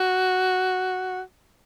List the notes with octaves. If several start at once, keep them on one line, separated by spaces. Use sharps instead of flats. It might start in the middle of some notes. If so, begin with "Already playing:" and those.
Already playing: F#4